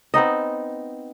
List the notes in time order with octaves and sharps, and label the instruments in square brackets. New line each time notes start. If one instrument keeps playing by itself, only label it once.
[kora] B3 C4 D#4 D#5